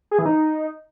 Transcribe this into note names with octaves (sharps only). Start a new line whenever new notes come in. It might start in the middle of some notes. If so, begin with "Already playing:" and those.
G#4
E3
D#4